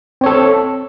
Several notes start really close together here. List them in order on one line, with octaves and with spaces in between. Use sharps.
C4 C#5 A4